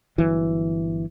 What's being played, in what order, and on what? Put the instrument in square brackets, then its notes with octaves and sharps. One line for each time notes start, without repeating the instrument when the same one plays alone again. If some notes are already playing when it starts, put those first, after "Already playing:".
[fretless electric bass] G1 E3 F#3